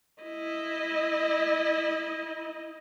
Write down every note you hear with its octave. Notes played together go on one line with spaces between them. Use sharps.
E4 D#5